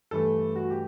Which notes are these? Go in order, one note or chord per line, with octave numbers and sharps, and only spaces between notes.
G2 E3 A3 A4
F#4
G4